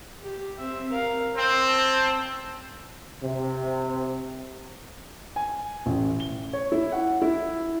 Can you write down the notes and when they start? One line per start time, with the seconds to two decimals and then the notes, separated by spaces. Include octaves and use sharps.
0.22 G4
0.59 C4 E5
0.92 A#4 F5
1.35 C4 C6
1.68 A5
3.23 C3
5.36 G#5
5.86 A1
6.20 G7
6.53 C#5
6.72 E4
6.92 F#5
7.22 E4